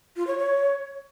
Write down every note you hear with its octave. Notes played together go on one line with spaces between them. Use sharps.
F4
C#5
C#5